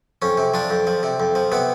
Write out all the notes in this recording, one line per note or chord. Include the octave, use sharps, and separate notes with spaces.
F2 C#4
C3
F3 D4
F2
F3
C3
F2
F3
C3 B3